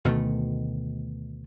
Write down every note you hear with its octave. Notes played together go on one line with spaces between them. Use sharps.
D2 B2 D#3 A3